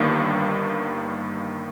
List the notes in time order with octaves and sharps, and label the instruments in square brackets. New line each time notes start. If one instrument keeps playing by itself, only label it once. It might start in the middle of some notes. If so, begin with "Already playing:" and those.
Already playing: [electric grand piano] G1 G2 D#3 A#3